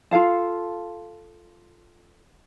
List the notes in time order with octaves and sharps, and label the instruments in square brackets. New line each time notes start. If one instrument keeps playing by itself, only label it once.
[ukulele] F4 A4 F5 A5